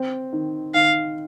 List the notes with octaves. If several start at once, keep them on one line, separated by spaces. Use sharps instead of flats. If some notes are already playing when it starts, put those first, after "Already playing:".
Already playing: C4
D#3
D#3 F5